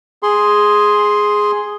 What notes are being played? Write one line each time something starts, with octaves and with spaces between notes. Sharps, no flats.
G#4 C6